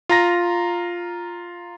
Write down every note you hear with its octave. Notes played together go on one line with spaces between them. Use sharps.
F4 A#5 A#6